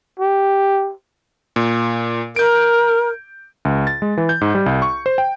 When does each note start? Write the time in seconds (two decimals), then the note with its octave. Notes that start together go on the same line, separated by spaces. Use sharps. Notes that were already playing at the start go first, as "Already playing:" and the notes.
0.20 G4
1.56 A#2
2.36 A#4 G6 D7
3.65 C#2
3.87 A6
4.02 G#3
4.17 E3
4.29 G6
4.41 G#2
4.55 G3
4.66 C2
4.82 C#6
5.06 C5
5.18 G5